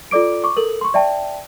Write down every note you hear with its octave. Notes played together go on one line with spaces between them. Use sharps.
F4 A4 D5 D6 D7
C#6 D6
A4 A#4 F#7
C6 C#6
D5 E5 G5 A5